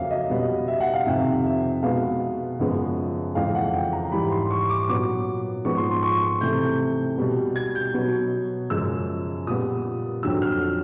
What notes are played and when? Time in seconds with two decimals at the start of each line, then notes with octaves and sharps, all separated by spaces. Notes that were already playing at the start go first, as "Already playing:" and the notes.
Already playing: F2 C#3 F#3 A#3 E5 F5
0.11 D#5
0.30 B2 G3 B3
0.68 E5
0.80 F#5
0.94 F5
1.06 F2 C3 D#3 E5
1.45 E5
1.83 B2 G#3 B3 F5
2.59 F#2 C#3 F3 G#3 B3
3.35 F2 C#3 E3 G#3 F5
3.55 F#5
3.74 G5
3.93 A#5
4.12 G#2 E3 G3 B5
4.31 C6
4.51 C#6
4.69 D6
4.89 A#2 F#3 B3 D6
5.65 G#2 F3 G#3 B3 C#6
5.77 C6
5.90 C6
6.03 C#6
6.22 C#6
6.41 C3 E3 A3 G6
6.61 G6
7.17 B2 G3 B3
7.56 G#6
7.75 G6
7.94 B2 F#3 B3
8.70 F#2 C#3 F3 G#3 E6
9.47 A#2 G3 B3 D#6
10.23 F2 D3 F#3 E6
10.42 F6